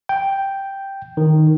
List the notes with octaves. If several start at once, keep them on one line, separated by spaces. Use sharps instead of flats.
G5
D#3